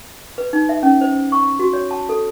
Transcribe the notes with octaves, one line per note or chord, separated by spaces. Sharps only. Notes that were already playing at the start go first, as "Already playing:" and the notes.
B4
D#4
E5
C#4
C5
C#6
F#4
C#5
A5
A4